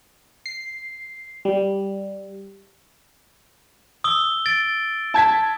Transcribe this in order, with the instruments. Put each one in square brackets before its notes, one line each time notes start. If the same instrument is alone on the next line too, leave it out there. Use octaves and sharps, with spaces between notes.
[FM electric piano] C7
G3
[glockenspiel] D#6 E6 G7
A6 D7
[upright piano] A5 G#6 B6